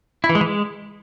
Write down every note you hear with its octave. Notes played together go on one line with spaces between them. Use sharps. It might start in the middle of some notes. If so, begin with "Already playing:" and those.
E4
E3
G#3
E3
G#3